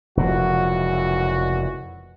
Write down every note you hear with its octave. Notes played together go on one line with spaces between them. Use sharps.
F1 C#2 A#2 E3 F3 F#4